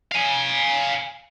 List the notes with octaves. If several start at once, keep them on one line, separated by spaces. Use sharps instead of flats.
F5 G#5